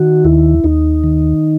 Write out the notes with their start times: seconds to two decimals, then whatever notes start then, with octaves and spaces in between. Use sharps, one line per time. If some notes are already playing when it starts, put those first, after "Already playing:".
Already playing: D#3 F#4
0.24 D#2 E4
0.64 D#2 D#4
1.04 D#3